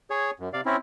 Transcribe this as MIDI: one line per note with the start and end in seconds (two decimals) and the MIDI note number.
0.10 0.31 68
0.10 0.31 73
0.40 0.49 42
0.53 0.61 48
0.53 0.61 74
0.53 0.61 77
0.66 0.76 60
0.66 0.76 61
0.66 0.76 64